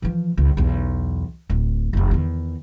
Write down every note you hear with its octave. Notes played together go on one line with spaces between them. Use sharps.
E3 F3
C#2
B1 E2
D1
F1 F2
E2 D#3